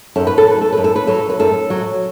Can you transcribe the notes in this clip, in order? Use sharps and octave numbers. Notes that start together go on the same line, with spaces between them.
F#2 A4
B4
A4
F#3 B4
A4
F#2 B4
A4
B4
F#3 A4
B4
F#2 A4
F#3